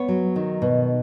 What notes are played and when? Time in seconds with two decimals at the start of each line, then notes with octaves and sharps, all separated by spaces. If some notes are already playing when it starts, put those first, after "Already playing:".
Already playing: B3 C#5
0.08 F#3
0.36 D#3
0.62 B2